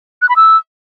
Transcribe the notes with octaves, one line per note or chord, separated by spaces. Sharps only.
F#6
B5
E6